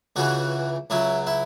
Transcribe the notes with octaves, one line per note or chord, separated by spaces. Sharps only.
C#2 C#3 E3 F#4
C#2 C#3 F#3 E4
E4